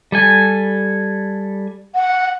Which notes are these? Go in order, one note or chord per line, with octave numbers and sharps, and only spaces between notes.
G3 A4 G#5
F#5